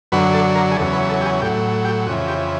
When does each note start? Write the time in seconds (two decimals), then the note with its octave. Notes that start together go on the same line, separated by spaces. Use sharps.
0.12 F#2 D3 F#3 B4
0.34 A4
0.55 A#4
0.71 G#4
0.77 E2 C#3 F#3 A4
0.93 B4
1.10 A4
1.21 G4
1.25 G#4
1.41 A2 F#3 G4
1.85 G4
2.06 F2 C#3 E3 F#4
2.28 G4